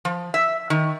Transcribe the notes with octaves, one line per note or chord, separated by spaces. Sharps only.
F3
E5
D#3